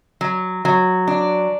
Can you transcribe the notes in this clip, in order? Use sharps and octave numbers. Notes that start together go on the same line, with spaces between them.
F#3
F#3
D4